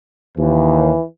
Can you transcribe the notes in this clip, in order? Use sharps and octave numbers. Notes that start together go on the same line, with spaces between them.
D#2 E3